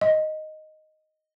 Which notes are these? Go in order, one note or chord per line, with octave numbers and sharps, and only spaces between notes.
D#5